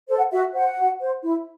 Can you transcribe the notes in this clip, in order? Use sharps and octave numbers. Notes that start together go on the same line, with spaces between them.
A4 C5
F#5
F#4 E5
C5 F#5
F#4
C5
E4